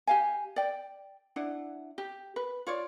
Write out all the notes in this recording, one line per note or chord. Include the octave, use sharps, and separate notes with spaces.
G4 F5 G#5
D5 G5
D4 E4 F#5
G4
B4
F4 C#5 D5